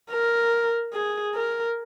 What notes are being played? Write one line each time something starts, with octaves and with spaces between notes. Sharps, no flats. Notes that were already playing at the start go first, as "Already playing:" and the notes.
A#4
G#4
A#4